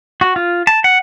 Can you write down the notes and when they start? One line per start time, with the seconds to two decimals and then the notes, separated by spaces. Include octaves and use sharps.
0.21 F#4
0.36 F4
0.67 A5
0.84 F#5